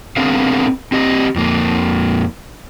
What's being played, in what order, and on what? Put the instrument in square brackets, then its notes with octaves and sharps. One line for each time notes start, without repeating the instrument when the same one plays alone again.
[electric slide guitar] B3 C4 D4 G#4 A#4 F5
C4 G4 D#5
F2 A#3